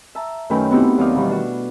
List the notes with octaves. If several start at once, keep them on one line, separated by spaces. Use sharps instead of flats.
E5 A5 A#5
F#2 D#3 A3 C#4 B4 G5
B3 C4 D#4 E4 F#4 G4
D#2 F#3 D#4 D5 F5 D#6
B2 D#3 E3 G3
D4 F#4